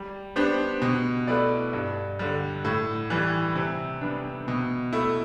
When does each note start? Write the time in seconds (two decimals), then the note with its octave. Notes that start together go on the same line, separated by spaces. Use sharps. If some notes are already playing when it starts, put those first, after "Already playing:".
Already playing: G3
0.36 B3 D4 G4 C5
0.82 B2
1.28 A3 E4 B4 D5
1.73 G2
2.19 D3 G3
2.65 A2
3.10 E3 G3
3.55 C3
4.01 G3 B3 D4
4.48 B2
4.93 A3 E4